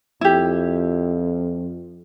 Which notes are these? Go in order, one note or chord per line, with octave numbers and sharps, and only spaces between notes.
F2 E4 G4